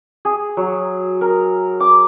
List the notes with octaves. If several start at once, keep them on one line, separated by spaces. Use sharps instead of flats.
G#4
F#3
A#4
D6